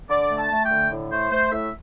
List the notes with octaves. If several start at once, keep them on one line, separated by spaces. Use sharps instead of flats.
D3 D5
A3
A5
A3
G5
D3
A2
A3 C5
A3 C5
A2 E5